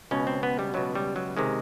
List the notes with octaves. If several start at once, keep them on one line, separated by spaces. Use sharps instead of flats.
C#2 B2 C#4
C4
B3
G3
C#2 B2 F#3
G3
F#3
C3 D#3 G#3